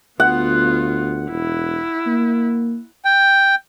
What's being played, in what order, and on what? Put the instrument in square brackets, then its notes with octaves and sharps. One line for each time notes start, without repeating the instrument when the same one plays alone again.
[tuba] D2 [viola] B3 F4 [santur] F#5
[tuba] E1 [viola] E4
[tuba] A#3
[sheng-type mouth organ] G5